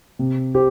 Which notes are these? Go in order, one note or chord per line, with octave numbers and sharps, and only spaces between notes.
C3
G4 C5